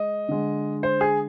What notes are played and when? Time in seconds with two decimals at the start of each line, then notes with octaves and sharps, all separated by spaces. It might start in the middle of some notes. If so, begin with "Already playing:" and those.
Already playing: G#3 D#5
0.29 D3 G#3
0.83 C5
1.01 G#4